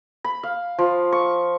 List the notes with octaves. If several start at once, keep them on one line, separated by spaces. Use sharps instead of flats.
B5
F5
F3
C#6